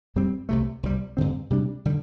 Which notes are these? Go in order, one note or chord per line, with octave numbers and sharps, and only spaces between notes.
G2 G3 C4
C2 C3 A3
C2 C3 G3
G2 D3 C4
C3 G3 D4
D3 G3